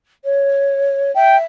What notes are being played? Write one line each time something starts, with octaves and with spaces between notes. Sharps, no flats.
C#5
E5 G5